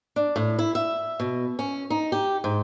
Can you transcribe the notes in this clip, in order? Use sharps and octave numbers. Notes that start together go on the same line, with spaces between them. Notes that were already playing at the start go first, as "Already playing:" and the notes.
D4
A2
E4
E5
B2
C#4
D#4
G4
G#2